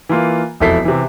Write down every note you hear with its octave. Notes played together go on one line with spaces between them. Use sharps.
E3 A#3 F4
E1 F2 E4 A4 B6 C7
C3 E3